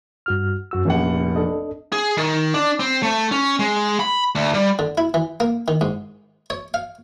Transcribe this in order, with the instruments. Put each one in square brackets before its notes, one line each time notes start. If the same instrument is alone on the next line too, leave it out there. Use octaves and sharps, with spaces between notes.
[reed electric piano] G2 F#4 F6
F#2 F#4 E6
[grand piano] F1 A#1 F#5 [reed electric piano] C#4
[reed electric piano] D4 A4 D#5
[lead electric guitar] G#4
D#3
D4
C4
A3
C#4
G#3
B5
D2
G3
[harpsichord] D3
E4
E3
A#3
D#3
G#2
C#5
F5